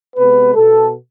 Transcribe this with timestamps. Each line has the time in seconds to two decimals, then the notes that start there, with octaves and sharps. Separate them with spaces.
0.16 C3 G#3 B3 B4
0.55 B2 B3 A4